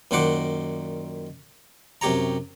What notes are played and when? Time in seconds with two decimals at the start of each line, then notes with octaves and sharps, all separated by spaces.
0.11 F#2 A#2 D#3 C5 F#5 D6
2.01 F#2 C3 G4 C#5 A#5